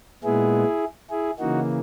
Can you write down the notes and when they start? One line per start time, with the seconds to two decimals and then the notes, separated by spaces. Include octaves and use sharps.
0.24 A#2 G#3 B3 E4 G#4
1.11 E4 G#4
1.39 C#3 E3 A#3 D#4 F#4